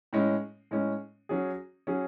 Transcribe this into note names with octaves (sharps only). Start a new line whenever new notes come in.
A2 G#3 C#4
A2 G#3 C#4
F#3 C#4 G#4
F#3 C#4 G#4